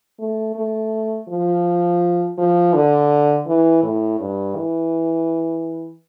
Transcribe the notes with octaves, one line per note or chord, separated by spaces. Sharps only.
A3
A3
F3
F3
D3
E3
A2
G2
E3